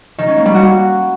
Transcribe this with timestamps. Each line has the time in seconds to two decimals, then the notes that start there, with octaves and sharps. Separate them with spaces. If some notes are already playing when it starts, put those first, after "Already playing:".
0.18 D#3
0.27 C#4
0.37 A#3
0.46 G3
0.55 F#4